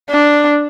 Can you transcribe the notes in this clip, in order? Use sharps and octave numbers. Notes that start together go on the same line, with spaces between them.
D4